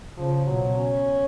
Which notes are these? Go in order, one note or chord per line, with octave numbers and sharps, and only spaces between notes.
C#3 F3
B2 F#3
C#4